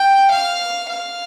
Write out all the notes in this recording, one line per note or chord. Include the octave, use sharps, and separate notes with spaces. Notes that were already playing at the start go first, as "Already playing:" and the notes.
Already playing: G5
F5
F5